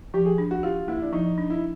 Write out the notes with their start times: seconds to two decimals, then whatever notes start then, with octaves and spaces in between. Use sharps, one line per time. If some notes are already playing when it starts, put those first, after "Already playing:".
0.14 F3 G4
0.26 G#4
0.38 D4
0.51 F#4
0.63 F4 G4
0.88 A#3 E4
1.02 D4
1.13 F3 D#4
1.38 D4
1.50 E4